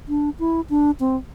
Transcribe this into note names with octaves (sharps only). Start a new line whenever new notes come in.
D4
E4
D4
C4